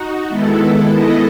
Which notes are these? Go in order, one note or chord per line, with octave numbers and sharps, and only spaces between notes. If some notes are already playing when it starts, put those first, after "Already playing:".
Already playing: D#4 F#4
D#3 G#3 B3 E4 A4
G#3 B3 E4 A4 D#5